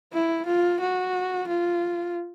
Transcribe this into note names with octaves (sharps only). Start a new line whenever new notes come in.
E4
F4
F#4
F4